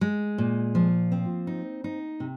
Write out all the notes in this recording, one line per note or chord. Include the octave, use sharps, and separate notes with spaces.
G#3
A#2
F3
C4
D#4
D#4
C3